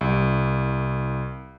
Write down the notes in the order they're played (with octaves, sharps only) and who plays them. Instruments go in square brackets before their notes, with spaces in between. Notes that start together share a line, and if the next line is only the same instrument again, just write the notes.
[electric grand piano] C2